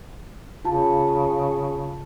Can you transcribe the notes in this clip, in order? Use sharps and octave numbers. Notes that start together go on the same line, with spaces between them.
C#3 F4 A5